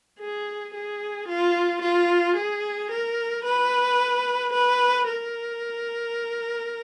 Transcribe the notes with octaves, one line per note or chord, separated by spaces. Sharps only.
G#4
G#4
F4
F4
G#4
A#4
B4
B4
A#4